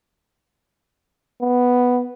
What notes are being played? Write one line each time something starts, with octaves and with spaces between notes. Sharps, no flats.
B3